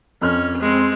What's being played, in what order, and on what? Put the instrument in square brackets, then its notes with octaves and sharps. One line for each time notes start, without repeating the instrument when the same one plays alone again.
[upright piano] F2 F6 [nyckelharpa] C#4
[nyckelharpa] G#3 C4